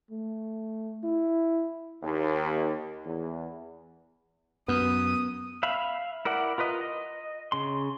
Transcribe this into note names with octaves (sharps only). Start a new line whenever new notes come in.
A3
E4
D#2
E2
F#2 B3 D#6
E5 F5 B5
E4 A#4 D5 F#5
F4 A#4 B4 D#5
D#5
C#3 C6